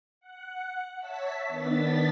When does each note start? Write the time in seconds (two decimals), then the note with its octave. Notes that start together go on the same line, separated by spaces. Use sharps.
0.20 F#5
0.99 C#5 E5 A5 B6
1.47 D#3 B3 D4 A6 B6